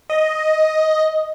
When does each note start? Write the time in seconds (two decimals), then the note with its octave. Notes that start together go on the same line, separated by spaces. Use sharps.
0.10 D#5